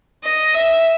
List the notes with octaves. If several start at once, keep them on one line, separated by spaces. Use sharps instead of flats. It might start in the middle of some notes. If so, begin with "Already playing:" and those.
D#5
E5